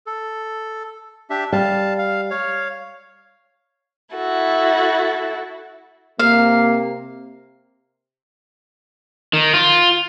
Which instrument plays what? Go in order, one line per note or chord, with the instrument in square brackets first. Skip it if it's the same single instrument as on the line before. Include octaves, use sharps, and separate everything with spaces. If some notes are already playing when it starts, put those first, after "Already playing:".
[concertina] A4
D4 G4 E5
[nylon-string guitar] G3 [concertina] F5 A5
[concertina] F5
C#5 F5
[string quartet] E4 F#4 A4
[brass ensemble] C3 [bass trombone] A#3 [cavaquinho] F5
[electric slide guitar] D#3
F4